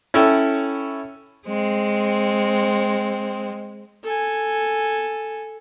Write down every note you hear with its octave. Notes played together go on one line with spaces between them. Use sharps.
C#4 E4 A4 C#5 G5
G#3 C4
A4 G#5